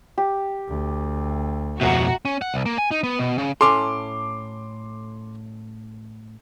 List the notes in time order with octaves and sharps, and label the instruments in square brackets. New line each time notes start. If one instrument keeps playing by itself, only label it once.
[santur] G4
[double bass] D2
[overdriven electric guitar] F2 B2 [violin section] F#4 [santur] E5 A#5
[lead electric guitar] C#4
F#5
C2
A#3
G#5
D#4
B3
B2
C#3
[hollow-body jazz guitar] A2 C#4 A4 [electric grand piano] C6 D6